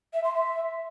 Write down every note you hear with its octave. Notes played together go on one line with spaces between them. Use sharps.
E5
C6
E5